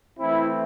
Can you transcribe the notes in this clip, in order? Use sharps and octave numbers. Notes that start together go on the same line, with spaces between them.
E3 A3 C4 E4